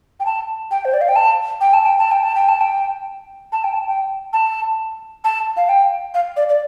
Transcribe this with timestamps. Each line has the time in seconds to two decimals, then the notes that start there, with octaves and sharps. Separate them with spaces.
0.20 G5
0.26 A5
0.71 G5
0.85 C5
0.94 D5
1.01 F5
1.09 G5
1.16 A5
1.61 G5
1.74 A5
1.86 G5
1.99 A5
2.11 G5
2.23 A5
2.35 G5
2.49 A5
2.61 G5
3.52 A5
3.64 G5
3.74 A5
3.88 G5
4.33 A5
5.24 A5
5.57 F5
5.69 G5
6.14 F5
6.37 D5
6.49 D5